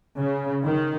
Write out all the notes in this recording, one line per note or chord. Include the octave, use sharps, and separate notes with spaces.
C#3
D#3